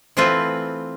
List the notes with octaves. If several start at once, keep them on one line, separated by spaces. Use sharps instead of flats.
E3 A3 C4 F4 B4